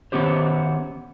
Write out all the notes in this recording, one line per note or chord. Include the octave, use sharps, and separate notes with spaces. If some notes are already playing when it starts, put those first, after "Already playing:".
D#3 E3 B3 C#4 G4 C5